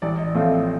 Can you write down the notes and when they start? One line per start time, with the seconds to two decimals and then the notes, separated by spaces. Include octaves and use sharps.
0.02 A1 D5
0.18 D#5
0.34 A2 F3 A3 C4 E5
0.51 D#5